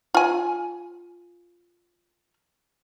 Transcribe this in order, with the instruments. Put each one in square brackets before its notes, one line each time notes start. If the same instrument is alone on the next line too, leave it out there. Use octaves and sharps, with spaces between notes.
[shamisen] F4 G#5